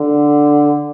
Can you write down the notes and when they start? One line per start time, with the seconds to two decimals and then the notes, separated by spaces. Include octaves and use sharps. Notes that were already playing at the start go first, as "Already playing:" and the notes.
Already playing: D3